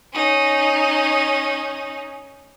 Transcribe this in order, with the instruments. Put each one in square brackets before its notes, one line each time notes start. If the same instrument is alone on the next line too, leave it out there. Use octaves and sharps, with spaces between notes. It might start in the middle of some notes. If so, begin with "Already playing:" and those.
[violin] C#4 D#4